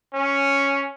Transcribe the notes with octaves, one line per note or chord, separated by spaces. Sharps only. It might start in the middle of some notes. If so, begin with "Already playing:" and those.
C#4